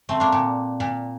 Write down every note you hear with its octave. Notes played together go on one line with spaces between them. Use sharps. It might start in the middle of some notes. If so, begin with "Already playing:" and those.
A3 C4
A#3 D4
A#2
A#2